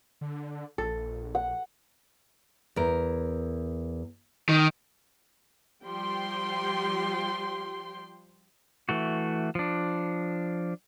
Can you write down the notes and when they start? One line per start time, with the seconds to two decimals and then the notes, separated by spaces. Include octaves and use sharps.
0.21 D3
0.78 A#1 A4
1.35 F#5
2.76 E2 A#4
4.49 D#3
5.83 F3 G3 G4 G5 C6
8.89 E3 A3 F#4
9.55 F3 D4